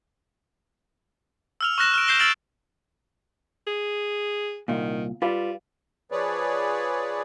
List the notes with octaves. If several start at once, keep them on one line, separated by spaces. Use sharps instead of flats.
E6 F6 F7
C#6 F6 F#6 A#6 E7
F6 D7
G6 C7 E7 G7
E6 F6 A6 D7 F7 F#7
G#4
C2 A#2 D#3
G3 F4 B4
F3 G#4 B4 C#5 D5